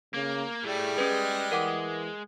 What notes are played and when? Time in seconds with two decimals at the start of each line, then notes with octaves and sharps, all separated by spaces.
0.14 C#3 A#3
0.64 A2 G3 A3 G#4
0.98 G#3 C#4 B4
1.52 E3 A#4 F#5 D6